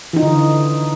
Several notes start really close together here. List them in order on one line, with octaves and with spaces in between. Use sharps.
E3 D#4 F4 D3